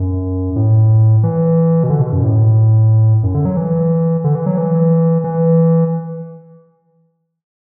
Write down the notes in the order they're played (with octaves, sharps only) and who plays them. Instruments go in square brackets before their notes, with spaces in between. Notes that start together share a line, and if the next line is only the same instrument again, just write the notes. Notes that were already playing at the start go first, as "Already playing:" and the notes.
Already playing: [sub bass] F#2
A2
E3
B2
D3
B2
F#2
A2
F#2
D3
F#3
E3
D3
E3
F#3
E3
E3